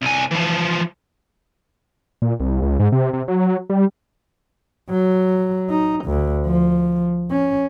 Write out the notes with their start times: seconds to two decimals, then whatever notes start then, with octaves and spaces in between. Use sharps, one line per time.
0.02 C2 G#5
0.31 E3 F3
2.22 A#2
2.40 C2
2.62 C#2
2.80 G#2
2.92 C3
3.13 C3
3.28 F#3
3.70 G3
4.90 F#3
5.70 D#4
6.05 D2
6.46 F3
7.31 C#4